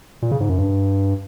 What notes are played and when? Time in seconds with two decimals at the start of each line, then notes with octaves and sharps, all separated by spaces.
0.22 A#2
0.31 C#3
0.40 G#2
0.49 F#2
0.58 G2